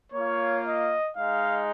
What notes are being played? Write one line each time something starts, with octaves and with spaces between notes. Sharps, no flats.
A#3 F4 C#5
D#5
G#3 D#4 F5